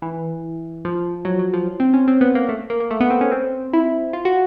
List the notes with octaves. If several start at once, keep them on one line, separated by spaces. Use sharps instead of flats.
E3
F3
F#3
F#3
F3
C4
C#4
C4
B3
A#3
A3
A#3
A#3
A3
B3
C4
C#4
C4
E4
F4
F#4